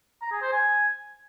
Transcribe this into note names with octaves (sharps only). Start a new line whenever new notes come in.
A#5
G#4
C5
G#5